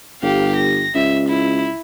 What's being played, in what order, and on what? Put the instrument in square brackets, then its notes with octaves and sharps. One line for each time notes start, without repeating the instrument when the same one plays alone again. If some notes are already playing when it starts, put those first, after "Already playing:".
[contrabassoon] G1 [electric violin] G4 F5
[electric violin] A#6
[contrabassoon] C#2 [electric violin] E5
[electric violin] E4